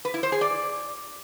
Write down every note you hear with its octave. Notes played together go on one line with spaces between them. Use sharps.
B4
E4
C5
G#4
D5